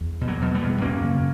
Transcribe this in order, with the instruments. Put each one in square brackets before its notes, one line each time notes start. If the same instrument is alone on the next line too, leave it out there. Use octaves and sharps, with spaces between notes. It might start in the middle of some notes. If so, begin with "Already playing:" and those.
[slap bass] E2
B2
F#3 A#3
B2
G3 B3
E2
F#2 A#3 C#4
C#3